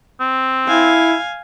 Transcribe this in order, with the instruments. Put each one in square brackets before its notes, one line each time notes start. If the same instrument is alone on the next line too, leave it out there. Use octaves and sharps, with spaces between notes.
[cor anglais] C4
[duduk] E4 [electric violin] F5 G#5